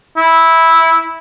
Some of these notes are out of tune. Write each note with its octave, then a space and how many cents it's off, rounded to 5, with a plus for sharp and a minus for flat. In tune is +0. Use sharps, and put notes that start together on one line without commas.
E4 -10